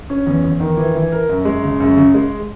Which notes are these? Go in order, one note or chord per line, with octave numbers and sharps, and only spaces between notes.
C#4
E2
E2
D#3
E3
E3
A#4
F#2
G#3
C#3
F#2
C#3
G#3